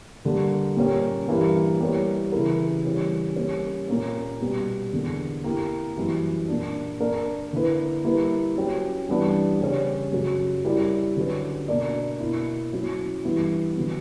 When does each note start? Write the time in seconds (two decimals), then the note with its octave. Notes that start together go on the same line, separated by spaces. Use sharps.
0.25 G2 D3 G3 A#3
0.77 A#2 G3 A#3 C#4 G4
1.28 G2 E3 A#3 E4 A#4
1.80 G3 B3 E4 A#4 C#5
2.32 C#3 E3 B3 E4 A#4
2.84 C#3 E3 G3 C#4
3.36 G3 A#3 C#4
3.88 A#2 A#3 C#4
4.41 B2 G3 B3
4.93 E2 D3 A#3
5.44 A#3 E4 G4
5.97 F#2 E3 G3
6.48 A#2 A#3 D4
7.00 A#3 D4 A#4 D5
7.53 D3 A#3 E4 B4
8.05 G3 A#3 E4 B4
8.57 F#3 C#4 G4
9.09 G2 E3 G3 B3 D4
9.61 C#3 G3 C#4
10.13 F#2 C#3 F#3
10.65 G3 C#4 E4 A#4 D5
11.17 D3 F#3 C#4 F#4 B4
11.68 B2 A#3 D4 A#4 D5
12.20 B2 A#3 E4
12.73 F#3 C#4 E4
13.25 G2 E3 B3 E4
13.76 D3 F#3 B3